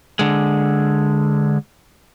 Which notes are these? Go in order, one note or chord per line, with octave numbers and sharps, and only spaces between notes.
D3 G#3